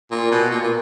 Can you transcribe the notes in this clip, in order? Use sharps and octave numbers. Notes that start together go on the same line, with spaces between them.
A#2
B2
A#2
A#2